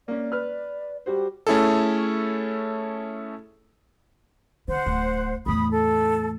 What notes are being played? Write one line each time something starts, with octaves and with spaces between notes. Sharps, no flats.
A#3 C#4 D5
B4 F6
G3 F#4 G4 C5
A3 C#4 E4 G#4 A4
D3 C5 F#5
D1
E2 A2 B5 D#6
A4